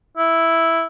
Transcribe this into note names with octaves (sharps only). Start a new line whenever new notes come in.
E4